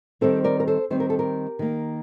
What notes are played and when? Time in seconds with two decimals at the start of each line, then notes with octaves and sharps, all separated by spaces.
0.21 D#3 G3 C4 A4 C5
0.44 A#4 D5
0.60 A#4
0.67 A4 C5
0.90 D#3 G3 C4 C5
1.00 A#4
1.10 A4
1.19 G4 A#4
1.59 D#3 A#3